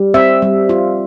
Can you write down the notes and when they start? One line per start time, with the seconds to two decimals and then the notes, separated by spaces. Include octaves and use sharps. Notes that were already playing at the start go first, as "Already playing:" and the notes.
Already playing: G3
0.14 C4 E5
0.42 G3
0.69 F4